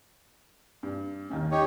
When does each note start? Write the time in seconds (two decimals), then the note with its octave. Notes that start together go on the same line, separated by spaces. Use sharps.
0.83 G2
1.30 D#2 D#3 C#4
1.51 D#4 G4 C#5